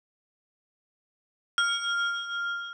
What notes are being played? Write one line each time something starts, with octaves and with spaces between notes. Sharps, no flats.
F6